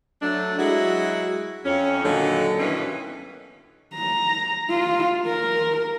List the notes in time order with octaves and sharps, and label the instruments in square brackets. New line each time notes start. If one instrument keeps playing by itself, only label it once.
[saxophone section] F#3 A3 D4
F#3 G#3 E4 F#4
F2 C#4
A#2 D3 D#3 F#3
G2 B2 D#3 E3 C#4 B4
[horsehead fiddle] A#5
F4
A#4